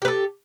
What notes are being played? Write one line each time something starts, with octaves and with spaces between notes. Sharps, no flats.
G4 A4 B4